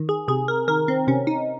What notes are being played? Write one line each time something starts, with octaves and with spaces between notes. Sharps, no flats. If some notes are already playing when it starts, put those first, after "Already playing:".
Already playing: D#3
G#4
C3 G#4
A#4
D#3 A#4
C4
C3 C#4
D#4